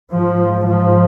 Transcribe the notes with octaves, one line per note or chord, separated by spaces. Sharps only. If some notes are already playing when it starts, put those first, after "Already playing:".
G#2 F3
F3